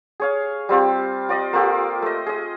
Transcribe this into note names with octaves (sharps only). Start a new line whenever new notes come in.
G#4 C#5 F5
G3 C4 F4 G4
F4 D5 D#5
A#3 F4 G4 A4
A3 D#5
G#4 D#5